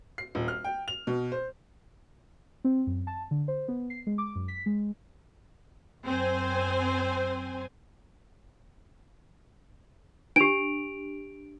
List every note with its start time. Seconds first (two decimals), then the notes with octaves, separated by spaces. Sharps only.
0.18 C7
0.35 D#1
0.48 F6
0.64 G5
0.88 F7
1.07 B2
1.32 C5
2.64 C4
2.87 F#2
3.07 A5
3.31 D3
3.48 C5
3.68 B3
3.90 C7
4.07 G#3
4.18 D6
4.35 F#2
4.48 B6
4.66 G#3
6.05 F#2 C4 C5 G#5
10.36 D4 G4 D7 F7